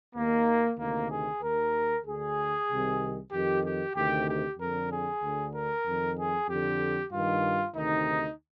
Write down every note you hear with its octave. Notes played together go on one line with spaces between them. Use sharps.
D#2 D#3 A#3
D2 C3 D#3 A#3
G#4
D#2 D#3 A#4
D2 D3 G#4
C2 C3 D#3
F2 D#3 G4
G4
D2 C3 D#3 G4
G4
F2 D3 A#4
G#4
D2 D3
A#4
F2 D#3
G#4
F2 D3 G4
G2 D#3 F4
D2 C3 D#3 D#4